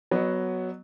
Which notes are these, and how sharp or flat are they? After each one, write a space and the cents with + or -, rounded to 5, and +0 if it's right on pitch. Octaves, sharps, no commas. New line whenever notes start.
F#3 +0 B3 +0 D#5 -35